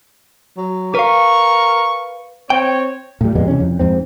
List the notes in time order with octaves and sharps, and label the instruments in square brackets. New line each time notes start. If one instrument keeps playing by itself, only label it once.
[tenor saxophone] F#3
[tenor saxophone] A#4 [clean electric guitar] B4 F5 [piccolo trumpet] C#6
[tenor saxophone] C4 [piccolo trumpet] C#5 [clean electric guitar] G5
[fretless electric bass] A2 G3
F2 G3 G#3 B3
C3 E3 C#4
F2
F2 G#2 C4